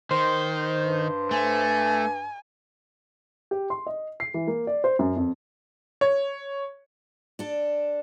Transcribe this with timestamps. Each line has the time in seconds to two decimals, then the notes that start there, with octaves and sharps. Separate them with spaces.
0.11 D#3 C5
0.81 G2
1.31 A3 G#5
3.51 G4
3.70 C6
3.86 D#5
4.20 C7
4.34 E3
4.47 A#3
4.67 D5
4.84 C5
4.99 F#2
5.16 F2
6.01 C#5
7.39 D4 A4